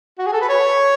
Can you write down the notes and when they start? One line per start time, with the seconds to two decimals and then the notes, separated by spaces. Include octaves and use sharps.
0.18 F#4
0.26 G#4
0.33 A4
0.41 B4
0.49 C#5